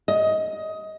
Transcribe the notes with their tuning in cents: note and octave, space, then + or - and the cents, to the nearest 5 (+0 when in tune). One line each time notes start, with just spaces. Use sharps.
D#5 +15